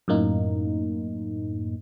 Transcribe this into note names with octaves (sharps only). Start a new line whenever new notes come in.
F#2 A2 A#3 D#4